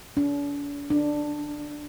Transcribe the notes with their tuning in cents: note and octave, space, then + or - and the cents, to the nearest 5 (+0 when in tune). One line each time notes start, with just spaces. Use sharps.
D4 -45
D4 +10